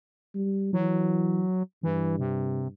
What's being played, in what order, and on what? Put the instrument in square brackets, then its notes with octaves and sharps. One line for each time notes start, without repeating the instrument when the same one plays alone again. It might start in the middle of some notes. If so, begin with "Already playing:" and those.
[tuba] G3
[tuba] E3 [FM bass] F#3
[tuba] G2 [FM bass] E3
[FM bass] C3